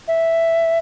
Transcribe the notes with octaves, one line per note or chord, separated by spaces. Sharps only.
E5